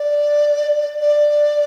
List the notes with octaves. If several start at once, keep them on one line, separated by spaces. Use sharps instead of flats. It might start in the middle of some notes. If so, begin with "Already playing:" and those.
Already playing: D5
D5